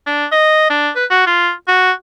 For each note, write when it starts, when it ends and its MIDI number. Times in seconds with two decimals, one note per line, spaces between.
0.07 0.26 62
0.32 0.69 75
0.70 0.90 62
0.95 1.05 71
1.10 1.25 66
1.26 1.52 65
1.68 1.92 66